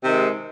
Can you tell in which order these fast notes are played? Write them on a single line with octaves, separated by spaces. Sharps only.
C3 D#3 G#3